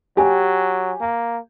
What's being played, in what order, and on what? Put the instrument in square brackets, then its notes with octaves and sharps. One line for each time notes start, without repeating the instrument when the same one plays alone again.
[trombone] F#3 [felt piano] G4 G#5
[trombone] A#3